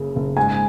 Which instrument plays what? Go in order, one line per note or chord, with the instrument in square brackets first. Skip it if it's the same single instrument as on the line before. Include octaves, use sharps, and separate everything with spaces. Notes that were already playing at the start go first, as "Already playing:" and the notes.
Already playing: [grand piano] F#1 C#3
F#1
[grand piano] G#2 [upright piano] G#5